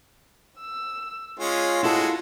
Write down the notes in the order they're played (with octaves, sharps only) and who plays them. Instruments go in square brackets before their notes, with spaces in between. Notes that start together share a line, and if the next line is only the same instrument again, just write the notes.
[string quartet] E6
[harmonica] G#3 C#4 [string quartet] F4
[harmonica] G#3 F#4 [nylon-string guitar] E4 A4